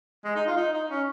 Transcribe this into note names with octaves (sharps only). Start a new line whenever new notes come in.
G#3
D#4
F4
D#4
D#4
C#4